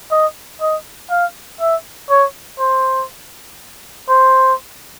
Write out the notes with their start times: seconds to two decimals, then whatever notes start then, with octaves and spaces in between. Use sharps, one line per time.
0.11 D#5
0.61 D#5
1.11 F5
1.60 E5
2.10 C#5
2.59 C5
4.09 C5